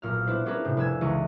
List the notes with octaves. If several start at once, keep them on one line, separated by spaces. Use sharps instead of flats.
B1 A#2 F6
B3 D4 E4 B4 C5
B3 C#4 D4 G#4 A#4 B4
A2 C3 G6
F1 B4 G#5 E6 G#6
C#2 E3 D#4 C#6 D#7